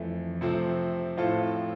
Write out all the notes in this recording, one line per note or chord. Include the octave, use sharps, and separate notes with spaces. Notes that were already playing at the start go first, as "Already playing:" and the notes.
Already playing: F2 E3 A3
C3 F3 A3 C4
A2 F3 C4 F4 A4